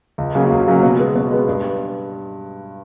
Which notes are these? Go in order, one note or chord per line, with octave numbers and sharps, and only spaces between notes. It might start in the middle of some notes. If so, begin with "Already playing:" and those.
C#2
C#3 F#3 A#3 C#4
C#2
C#3 F#3 A#3 C#4
B2
G#3 B3
B2
G#3 B3
G2